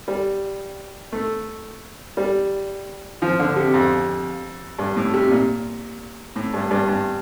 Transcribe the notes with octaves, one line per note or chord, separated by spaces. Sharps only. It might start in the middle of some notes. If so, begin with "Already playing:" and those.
G3
A3
G3
F3
D3
C3
F2
G2
A2
C3
A#2
A2
G2
G2
G2